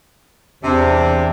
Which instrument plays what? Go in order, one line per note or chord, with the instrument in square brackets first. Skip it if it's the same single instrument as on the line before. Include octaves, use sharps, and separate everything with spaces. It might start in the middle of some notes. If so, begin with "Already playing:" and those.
[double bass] E2 D4 [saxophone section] C3